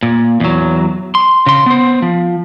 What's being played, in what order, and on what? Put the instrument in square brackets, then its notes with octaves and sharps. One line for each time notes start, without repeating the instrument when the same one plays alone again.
[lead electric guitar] A#2
E2 F#3
C6
C#3 C6
B3 C5
F3